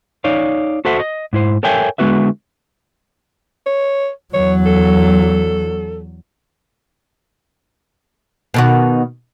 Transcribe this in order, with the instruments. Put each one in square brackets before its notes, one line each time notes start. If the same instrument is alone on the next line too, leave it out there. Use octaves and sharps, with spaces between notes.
[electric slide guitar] D#4 C#5 D5 F5
F#4 A4 C5 E5 F#5
D#5
G#2 E4 C5
A4 A#4 C#5 E5 G5 G#5
D3 G#3 B3 F#4 B4 E5
[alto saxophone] C#5
[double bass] E2 F#3 [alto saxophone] C#5
[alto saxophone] A4
[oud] B2 D#3 F#4